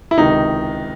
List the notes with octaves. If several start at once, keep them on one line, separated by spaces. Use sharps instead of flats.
E4
C#2 C3 D#3 D#4